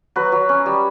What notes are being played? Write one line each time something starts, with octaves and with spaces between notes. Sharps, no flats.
F#3 B4
F#3
C#4
G3